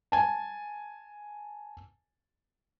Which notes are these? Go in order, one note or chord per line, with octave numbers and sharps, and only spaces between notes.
G#5 A5